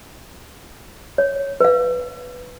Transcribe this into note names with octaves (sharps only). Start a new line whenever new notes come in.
C#5
B4 F5